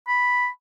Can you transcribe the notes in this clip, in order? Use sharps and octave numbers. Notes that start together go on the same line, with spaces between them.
B5